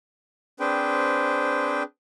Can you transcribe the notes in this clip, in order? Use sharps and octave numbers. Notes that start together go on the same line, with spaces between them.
C4 D4 G#4 B4 C5 G5